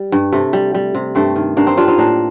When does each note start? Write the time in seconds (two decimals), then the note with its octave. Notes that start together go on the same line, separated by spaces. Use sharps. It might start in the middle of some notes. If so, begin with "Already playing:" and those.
Already playing: G3
0.12 G2
0.32 C3 A3
0.53 G3
0.75 G3
0.95 C3
1.15 G2 A3 C4
1.36 D#3
1.57 G2 A#3 D4
1.67 C4 D#4
1.77 G3 D4 F4
1.88 C4 D#4
1.98 A2 A#3 D4